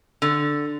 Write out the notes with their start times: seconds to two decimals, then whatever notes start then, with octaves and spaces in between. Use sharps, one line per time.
0.22 D3